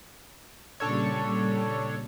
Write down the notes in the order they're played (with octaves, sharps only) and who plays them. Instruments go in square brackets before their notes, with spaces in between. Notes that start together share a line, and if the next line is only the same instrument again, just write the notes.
[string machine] A#2 C#3 G3 [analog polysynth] D4 A4 C#5